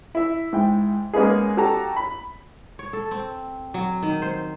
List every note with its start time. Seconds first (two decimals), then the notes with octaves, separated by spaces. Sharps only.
0.15 E4 E5
0.53 G#2 E4 G5
1.13 G#3 A#3 B3 C#4 D#4 G#4
1.57 F#4 G4 A4 A5 A#5
1.96 B5
2.79 C#5
2.93 A4
3.11 C4
3.74 F#3
4.03 D#3
4.22 C5